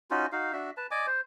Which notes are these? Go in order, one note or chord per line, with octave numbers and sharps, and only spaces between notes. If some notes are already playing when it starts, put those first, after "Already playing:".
C#4 D#4 F4 F#4
D#4 F#4 F5
D4 F#4 E5
B4 A5
D5 D#5 G#5 D6
C5